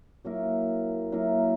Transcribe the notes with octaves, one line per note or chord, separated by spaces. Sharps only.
F#3 A#3 E4 A#4
F#3 A#3 E4 A#4